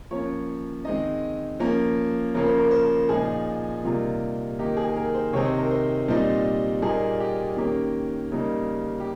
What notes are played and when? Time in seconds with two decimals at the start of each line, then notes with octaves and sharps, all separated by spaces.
0.11 F3 A#3 C#4 C#5
0.85 D#3 G#3 C4 D#4 D#5
1.60 F3 A#3 C#4
2.35 C#3 F3 A#3 C#4 A#4
2.46 C5
2.58 A#4
2.71 C5
2.84 A#4
3.09 A#2 F3 G#3 D#4 G#4
3.84 C3 G3 A#3 D#4 F4
4.59 D#3 A#3 D#4 G4
4.77 G#4
4.89 G#4
4.96 A#4
5.14 C5
5.33 C3 D#3 G#3 C4 D#4 C#5
5.45 C5
5.59 A#4
5.71 C5
6.08 A#2 G3 C4 D#4 C5
6.82 A#2 G3 A#3 D#4 G#4
7.20 G4
7.57 D#3 A#3 C#4 G4
8.32 C#3 G3 A#3 D#4
9.00 G4